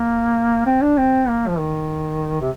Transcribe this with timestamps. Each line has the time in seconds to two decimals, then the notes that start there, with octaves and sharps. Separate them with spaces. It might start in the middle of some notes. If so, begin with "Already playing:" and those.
Already playing: A#3
0.66 C4
0.81 D4
0.97 C4
1.28 A#3
1.48 F3
1.58 D#3
2.41 C3